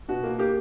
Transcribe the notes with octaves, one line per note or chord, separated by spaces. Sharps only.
B2 F#4
A#3
A#3 G4